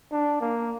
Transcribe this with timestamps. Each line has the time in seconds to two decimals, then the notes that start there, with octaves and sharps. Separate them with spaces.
0.12 D4
0.41 A#3